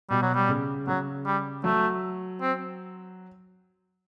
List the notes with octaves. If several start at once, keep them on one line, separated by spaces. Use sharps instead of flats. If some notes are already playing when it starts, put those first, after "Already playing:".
B2 G3
F#3
G3
C#3
C#3 F#3
G3
F#3 A3
C4